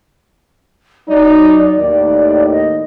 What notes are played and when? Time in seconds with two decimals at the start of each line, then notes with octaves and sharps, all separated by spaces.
1.08 F#3 D#4 D5
1.78 D#2 A2 D#3 D5
2.52 D#5